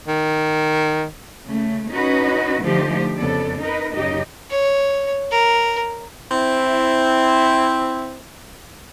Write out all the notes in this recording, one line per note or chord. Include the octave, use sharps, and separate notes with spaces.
D#3
C#3 A3
C#4 D#4 F#4 B4 D#5
D3 F3 A3 D#4 G4
F2 C#3 B3 A4 D5
D#4 A#4 B4 D#5
F#2 C#3 D#4 G4 D#5
C#5
A#4
C4 E4